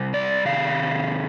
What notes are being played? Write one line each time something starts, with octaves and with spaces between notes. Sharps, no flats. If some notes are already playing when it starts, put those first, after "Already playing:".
Already playing: C3 G3
D5
C3 D#3 F5